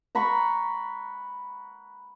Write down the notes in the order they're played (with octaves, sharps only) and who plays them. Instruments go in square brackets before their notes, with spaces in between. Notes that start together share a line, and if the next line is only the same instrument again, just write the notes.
[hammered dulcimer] F#5 A#5 B5 C#6